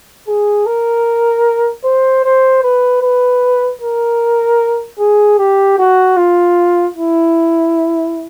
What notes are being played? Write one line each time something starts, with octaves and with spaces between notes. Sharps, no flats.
G#4
A#4
C5
C5
B4
B4
A#4
G#4
G4
F#4
F4
E4